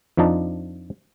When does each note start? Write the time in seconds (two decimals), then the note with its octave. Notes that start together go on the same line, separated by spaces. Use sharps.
0.17 F2 F3 D4 D#4 A5